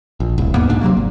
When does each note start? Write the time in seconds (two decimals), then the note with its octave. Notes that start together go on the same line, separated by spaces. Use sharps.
0.20 A#1
0.38 D1 C2
0.54 E2 G#2 A#3 B3
0.69 D#1 B1 G#2 D4
0.81 C3 F#3 A3 A#3
0.97 G#1